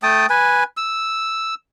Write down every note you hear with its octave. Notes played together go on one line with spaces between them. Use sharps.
A3 G5 A5 D#6
B4 G#5
E6